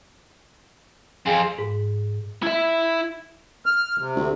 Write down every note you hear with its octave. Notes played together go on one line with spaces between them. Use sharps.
F2 C4 G#4 F5 G#5
G#2
E4 E5
F6
C3
D2